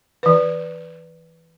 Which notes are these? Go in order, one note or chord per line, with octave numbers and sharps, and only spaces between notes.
E3 B4